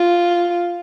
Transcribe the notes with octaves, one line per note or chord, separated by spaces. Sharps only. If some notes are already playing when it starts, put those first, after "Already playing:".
Already playing: F4